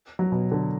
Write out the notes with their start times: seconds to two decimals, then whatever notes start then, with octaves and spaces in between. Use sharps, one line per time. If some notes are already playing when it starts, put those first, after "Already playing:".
0.19 F#3
0.32 B2
0.52 D3